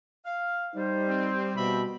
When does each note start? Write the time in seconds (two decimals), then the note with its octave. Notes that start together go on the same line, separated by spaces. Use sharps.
0.24 F5
0.74 G3 D#4 C5
1.08 C4
1.57 B2 C4 E5 B5